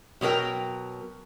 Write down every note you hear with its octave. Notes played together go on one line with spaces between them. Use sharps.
B2 F#3 A#3 A#4 G5